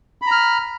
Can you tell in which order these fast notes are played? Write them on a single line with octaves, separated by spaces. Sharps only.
B5 A#5 F6